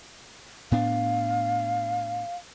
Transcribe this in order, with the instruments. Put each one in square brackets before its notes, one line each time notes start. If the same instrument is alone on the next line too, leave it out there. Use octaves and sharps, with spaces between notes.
[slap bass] A2 B3 D4 [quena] F5